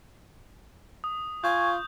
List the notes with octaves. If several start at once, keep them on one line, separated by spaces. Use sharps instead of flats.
D#6
F4 G#5 C#6 G6